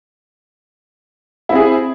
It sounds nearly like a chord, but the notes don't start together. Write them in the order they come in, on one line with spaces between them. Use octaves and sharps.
E4 C4 G#4